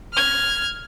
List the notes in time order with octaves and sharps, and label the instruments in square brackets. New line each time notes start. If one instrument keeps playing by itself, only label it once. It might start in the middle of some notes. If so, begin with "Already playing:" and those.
[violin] F6 G#6